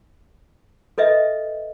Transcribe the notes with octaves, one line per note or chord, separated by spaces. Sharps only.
A4 B4 D#5 E5